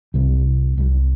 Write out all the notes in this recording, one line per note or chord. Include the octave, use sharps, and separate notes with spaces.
C2 C3 G3
C2 C3 G3